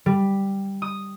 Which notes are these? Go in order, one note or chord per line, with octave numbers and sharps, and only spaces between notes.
G3
D#6